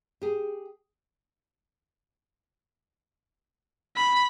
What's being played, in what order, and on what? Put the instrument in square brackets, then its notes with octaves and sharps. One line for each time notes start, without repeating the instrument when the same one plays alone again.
[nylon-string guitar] G4 G#4
[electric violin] B5